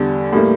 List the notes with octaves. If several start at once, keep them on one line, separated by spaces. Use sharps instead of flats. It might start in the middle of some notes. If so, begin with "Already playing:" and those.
Already playing: E2 D3 G3
A2 G3 A#3